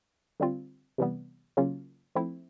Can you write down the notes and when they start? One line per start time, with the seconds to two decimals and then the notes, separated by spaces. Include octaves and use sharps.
0.40 D3 G3 C4 F4
0.98 C3 E3 G3 B3
1.57 C#3 F#3 A#3 C#4 F4
2.15 F3 A3 C4 E4